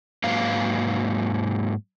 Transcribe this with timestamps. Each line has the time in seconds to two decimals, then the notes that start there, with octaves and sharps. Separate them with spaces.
0.24 G#2 F#3 A#3 B4 F5